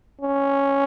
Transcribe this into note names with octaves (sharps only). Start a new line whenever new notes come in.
C#4